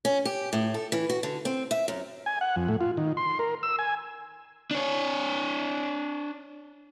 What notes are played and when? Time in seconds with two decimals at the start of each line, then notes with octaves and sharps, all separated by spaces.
0.05 C#4
0.25 G4
0.53 A2
0.74 A4
0.92 E3
1.09 F#4
1.23 D3
1.45 C4
1.71 E5
1.88 F#2
2.26 G#5
2.41 F#5
2.56 F2
2.68 A2
2.81 F4
2.97 D#3
3.17 C6
3.39 A#4
3.63 E6
3.79 G#5
4.71 D4 C#5